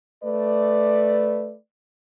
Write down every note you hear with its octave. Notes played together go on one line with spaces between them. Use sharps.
A3 B4 D5